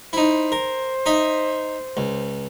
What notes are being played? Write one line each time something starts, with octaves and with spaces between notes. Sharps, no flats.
D#4 E4 C5
A#4
D#4 D#5 E5
C#2